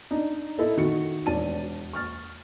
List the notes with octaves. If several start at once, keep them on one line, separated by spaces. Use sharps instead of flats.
D4 D#4
E4 A4 D#5
D#3 F#4 C#7
E1 D5 A5 D#7
C#6 F6 A6